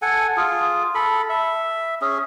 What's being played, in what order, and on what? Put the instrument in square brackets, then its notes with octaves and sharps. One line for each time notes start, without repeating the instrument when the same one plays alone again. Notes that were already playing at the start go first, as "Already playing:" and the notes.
[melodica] A4 F#5 G#5
F4 G#4
A4 B5
E5
C#4 G#4